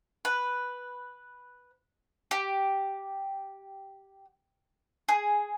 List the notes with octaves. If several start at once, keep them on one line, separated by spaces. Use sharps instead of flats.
B4
G4
G#4